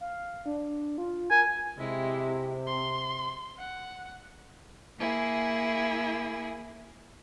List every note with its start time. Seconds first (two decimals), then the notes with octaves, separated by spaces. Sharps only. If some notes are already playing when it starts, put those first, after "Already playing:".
0.01 F5
0.46 D4
0.98 F4
1.31 A#4 G#5
1.78 C3 G#3 E4
2.67 C6
3.58 F#5
5.00 A#3 E4 G#4